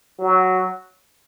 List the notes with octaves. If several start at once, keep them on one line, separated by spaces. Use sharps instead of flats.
F#3